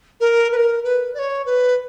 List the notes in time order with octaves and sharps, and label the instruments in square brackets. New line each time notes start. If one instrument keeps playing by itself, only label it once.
[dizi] A#4
B4
A#4
B4
D5
C#5
B4